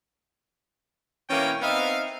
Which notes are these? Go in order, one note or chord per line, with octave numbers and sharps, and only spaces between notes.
B2 E3 A#3 C#4 C#5 G5
B3 C4 D#4 E5 F5